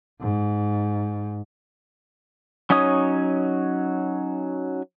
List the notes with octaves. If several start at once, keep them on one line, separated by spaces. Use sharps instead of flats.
G#2
F#3 C#4 D#4 C#5 D#6